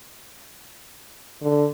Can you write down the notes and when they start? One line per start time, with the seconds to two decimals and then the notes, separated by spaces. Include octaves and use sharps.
1.42 D3